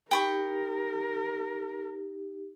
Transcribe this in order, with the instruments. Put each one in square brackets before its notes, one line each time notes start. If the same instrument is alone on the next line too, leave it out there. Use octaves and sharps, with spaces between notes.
[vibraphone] D#4 G4 [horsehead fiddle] A#4 [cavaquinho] G5 B5 C#6